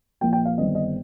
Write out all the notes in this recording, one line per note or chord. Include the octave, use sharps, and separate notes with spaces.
A#1 A#2 F3 A#3 G5
G5
F5
G1 G2 D#3 C4 D#5
D#5